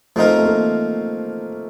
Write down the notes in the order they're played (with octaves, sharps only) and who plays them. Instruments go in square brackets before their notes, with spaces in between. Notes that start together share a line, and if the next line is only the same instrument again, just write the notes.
[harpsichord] F3 C4 D#4 A#4 [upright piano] A3
[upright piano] A3
A#3